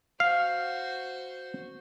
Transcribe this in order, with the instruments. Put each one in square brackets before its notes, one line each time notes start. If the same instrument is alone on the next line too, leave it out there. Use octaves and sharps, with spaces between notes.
[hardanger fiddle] F#4 C5 [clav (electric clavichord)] F5